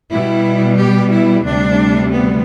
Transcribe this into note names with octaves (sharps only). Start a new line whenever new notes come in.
B2 G3 E4
G4
E4
D2 C3 G3 D4
B3